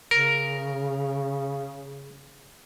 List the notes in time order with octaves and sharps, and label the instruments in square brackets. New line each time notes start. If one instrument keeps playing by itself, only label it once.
[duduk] C#3 [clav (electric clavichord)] A#4